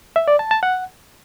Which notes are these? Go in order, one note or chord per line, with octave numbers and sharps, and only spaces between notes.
E5
D5
A5
A5
F#5